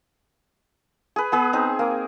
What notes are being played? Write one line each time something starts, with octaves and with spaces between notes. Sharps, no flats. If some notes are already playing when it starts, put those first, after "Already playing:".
G#4 B4
B3 G#4 B4
C4 D#4
A#3